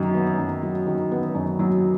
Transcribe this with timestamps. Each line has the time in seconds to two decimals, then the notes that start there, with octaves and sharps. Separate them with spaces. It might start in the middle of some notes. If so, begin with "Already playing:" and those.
Already playing: F#2 D#3 F#3
0.14 B3
0.38 F#2
0.63 F#3
0.87 D#3
1.11 B3
1.35 F#2
1.59 F#3